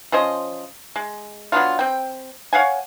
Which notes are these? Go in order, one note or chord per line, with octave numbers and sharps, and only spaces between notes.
F3 C#4 C5 D#5
G#3
F#3 B3 D4 F4
C4 G5
C#5 F5 F#5 G#5